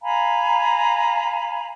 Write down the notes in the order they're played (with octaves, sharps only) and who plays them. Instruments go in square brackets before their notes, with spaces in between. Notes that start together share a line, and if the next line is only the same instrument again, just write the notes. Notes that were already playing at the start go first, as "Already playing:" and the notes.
[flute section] F5 G#5 A#5 B5